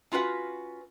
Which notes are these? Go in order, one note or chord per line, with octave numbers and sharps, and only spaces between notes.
C#4 F4 F#4 B4 F#5